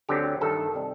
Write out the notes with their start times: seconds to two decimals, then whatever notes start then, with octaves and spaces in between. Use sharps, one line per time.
0.09 D2 D3 F#3 C4 G4
0.41 G2 D#3 A3 A4
0.74 C3 D#3 G3 C4